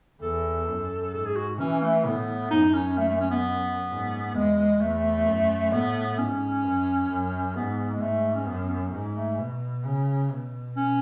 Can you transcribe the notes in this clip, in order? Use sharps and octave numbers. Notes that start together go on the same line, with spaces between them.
E2 A4
F#2
G#2 A4
G#4
F#4
E3 C#4
A3
A2 B3
F#2 D#4
C#4
A3
A3
C#4
B3
G#2
E2 G#3
E2 A3
F#2
A2 B3
G#2 C#4
F#2
F#2
G#2 B3
G#3
G#2 A3
C#4
F#2 B3
C#4
B3
C#4
G#2
A3
B2
C#3
B2
C#4